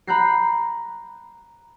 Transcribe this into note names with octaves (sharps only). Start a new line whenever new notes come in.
A#5 B5 F#6 G6 A#6 C7